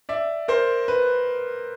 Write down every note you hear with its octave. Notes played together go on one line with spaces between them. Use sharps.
D5 E5
A#4 C5
B4